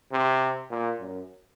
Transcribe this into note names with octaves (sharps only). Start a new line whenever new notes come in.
C3
A#2
F#2